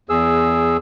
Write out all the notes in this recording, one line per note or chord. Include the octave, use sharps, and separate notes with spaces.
E2 G#4 E6